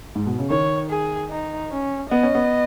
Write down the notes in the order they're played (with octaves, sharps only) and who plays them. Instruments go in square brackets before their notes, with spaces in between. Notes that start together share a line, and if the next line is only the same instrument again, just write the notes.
[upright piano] G#2
B2
C#3
[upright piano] D#3 [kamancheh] C#5
[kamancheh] G#4
D#4
C#4
[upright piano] B3 [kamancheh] D#5
[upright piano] C#4
B3